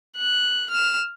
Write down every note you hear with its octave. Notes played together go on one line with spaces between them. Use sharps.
F#6
F6 E7